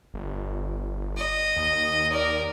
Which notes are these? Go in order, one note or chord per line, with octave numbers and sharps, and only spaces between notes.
G1
D#5
D#2
A#4 D5